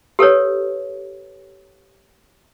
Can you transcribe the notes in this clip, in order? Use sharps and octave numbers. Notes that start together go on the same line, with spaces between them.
G4 A4 B4 C#5